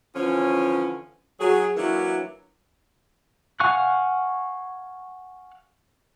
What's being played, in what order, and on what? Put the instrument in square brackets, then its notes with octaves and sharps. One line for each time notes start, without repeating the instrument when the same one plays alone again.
[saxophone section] D3 E3 F3 C#4
F#3 G#4
E3 F#3 A#3 C#4 D4 E4
[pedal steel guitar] F5 F#5 G#5 C#6 F#6